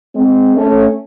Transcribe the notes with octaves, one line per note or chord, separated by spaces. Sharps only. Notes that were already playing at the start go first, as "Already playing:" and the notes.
G#3 C4
A3 C#4